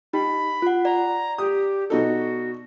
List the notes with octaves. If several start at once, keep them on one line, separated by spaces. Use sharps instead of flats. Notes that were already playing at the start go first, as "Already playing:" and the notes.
D#4 G4 B5
F4 F#5
D5 A#5
G4 D#6
B2 D#4 F#4 A4